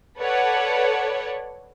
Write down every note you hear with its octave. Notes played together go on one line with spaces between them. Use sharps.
A4 B4 C#5 D5 F#5